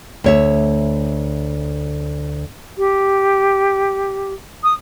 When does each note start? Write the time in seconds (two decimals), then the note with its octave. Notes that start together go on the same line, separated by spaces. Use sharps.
0.24 D2 C#5 E5
2.77 G4
4.63 D#6